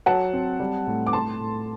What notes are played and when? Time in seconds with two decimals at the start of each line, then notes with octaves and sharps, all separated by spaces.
0.06 F#3 F#5 A5
0.33 C4
0.60 G3
0.87 A2
1.07 D6
1.13 A2 A5 C6
1.40 A2